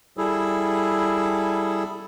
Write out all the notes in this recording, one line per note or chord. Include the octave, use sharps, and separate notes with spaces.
G3 E4 G#4 A4